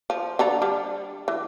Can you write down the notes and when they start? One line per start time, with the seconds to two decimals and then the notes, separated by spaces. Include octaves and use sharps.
0.10 F3
0.39 D3 A4 A#5
0.62 G3 D4
1.28 E3